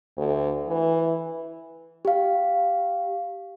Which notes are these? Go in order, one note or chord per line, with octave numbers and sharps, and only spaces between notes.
D2
E3
G4 F5